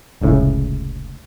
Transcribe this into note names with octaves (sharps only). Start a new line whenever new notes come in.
F1 C#2 A2 C#3